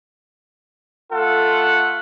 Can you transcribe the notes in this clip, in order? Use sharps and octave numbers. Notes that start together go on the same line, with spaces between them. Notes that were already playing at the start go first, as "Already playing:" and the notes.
A3 F4 A4 F#5